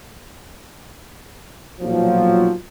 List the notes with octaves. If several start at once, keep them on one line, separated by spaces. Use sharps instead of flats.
B1 A#2 F3 F#3